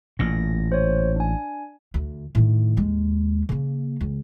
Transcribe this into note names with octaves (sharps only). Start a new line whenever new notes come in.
A1 A#2 A#6
C5 C#5
D4 G#5
D2
A2 D#3
D#2 G#3
C#3 A#3
C#2